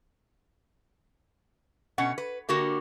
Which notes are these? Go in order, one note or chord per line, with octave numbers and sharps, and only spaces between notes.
B2 C#4 F#5
B4
D3 A#3 F#4 G4 A#4